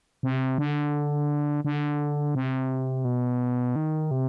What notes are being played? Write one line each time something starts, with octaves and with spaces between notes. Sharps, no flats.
C3
D3
D3
C3
B2
D#3
C3